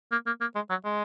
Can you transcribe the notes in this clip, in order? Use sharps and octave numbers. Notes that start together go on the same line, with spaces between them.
A#3
A#3
A#3
G#3
F#3
G#3